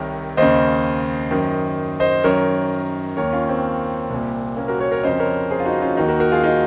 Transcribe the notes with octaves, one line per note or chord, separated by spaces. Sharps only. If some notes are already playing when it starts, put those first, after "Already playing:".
Already playing: C2 C3 D#3 A#4 C#5
D#2 C#3 C5 D#5
F#2 D#3
C5 D#5
F#2 D#3 A#4 C#5
D#2 D#3 A#4 C#5
C#4 F4
C4
C2 A#2
A#3 C#4
F#4 A#4
A#4 C#5
A#4 C#5
F2 C#3 C5 D#5
A#4 C#5
G#4 C5
F4
D#4 F#4
C#4 F4
D#2 D#3 D#4 F#4
F#4 A#4
F#4 A#4
F4 G#4
D#4 F#4